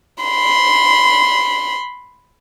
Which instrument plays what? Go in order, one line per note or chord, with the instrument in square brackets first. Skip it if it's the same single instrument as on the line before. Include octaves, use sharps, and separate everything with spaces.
[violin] B5 C6